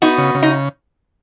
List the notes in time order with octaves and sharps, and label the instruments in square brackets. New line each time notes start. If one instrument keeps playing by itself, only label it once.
[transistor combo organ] B3 [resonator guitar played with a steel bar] D#4 F#4
[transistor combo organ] C#3
C#3
[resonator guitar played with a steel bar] D#4